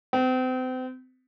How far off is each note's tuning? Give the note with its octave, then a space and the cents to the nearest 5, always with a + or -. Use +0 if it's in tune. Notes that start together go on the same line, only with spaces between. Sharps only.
C4 -35